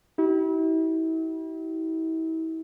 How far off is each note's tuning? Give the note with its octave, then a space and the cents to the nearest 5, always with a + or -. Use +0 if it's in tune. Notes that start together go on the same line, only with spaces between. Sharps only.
E4 -40 G4 -40